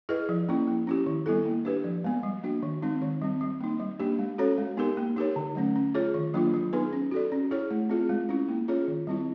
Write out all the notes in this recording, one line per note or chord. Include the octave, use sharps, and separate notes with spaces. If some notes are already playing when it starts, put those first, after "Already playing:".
E4 G#4 B4 D#5
F3
A#3 C#4 E4
A#3
C#4 E4 G4
D#3
G3 B3 E4 A4
A#3
D4 G4 B4
F3
G#3 B3
G3
A#3 D4 F#4
D#3
G#3 C4 D#4
D#3
G3 C4
G3
A#3 D#4
G3
A#3 D4 G4
G#3
C#4 F#4 A4 C#5
G#3
B3 D#4 G4 A#4
A#3
D#4 G4 A#4 C#5
D3
F#3 A3 C#4
C#4
F4 G#4 C#5
D#3
F#3 A#3 D4 F4
F#3
B3 D#4 G#4 B4
C#4
F#4 A4 D5
C#4
E4 G#4 C#5
A3
C4 F4 G#4
G#3
C#4 E4
A#3
C#4 F4 G#4 C#5
D#3
G3 C4 E4